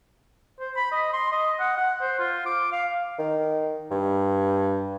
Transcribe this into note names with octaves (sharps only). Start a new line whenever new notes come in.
C5
B5
D#5
C6
D#5
F#5
F#5
C5
F4
D6
F5
D#3
G2